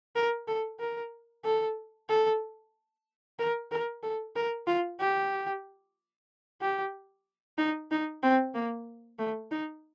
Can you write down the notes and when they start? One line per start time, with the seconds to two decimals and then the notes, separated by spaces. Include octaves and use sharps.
0.15 A#4
0.48 A4
0.80 A#4
1.45 A4
2.09 A4
3.39 A#4
3.71 A#4
4.03 A4
4.36 A#4
4.67 F4
5.00 G4
6.62 G4
7.58 D#4
7.91 D#4
8.23 C4
8.54 A#3
9.19 A3
9.51 D#4